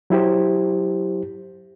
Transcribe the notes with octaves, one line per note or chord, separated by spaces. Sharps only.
F#3 E4 G4 C5